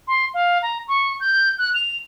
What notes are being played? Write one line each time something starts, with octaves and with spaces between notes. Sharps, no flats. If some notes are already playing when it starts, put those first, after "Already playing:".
C6
F5
A#5
C#6
G6
F#6
F7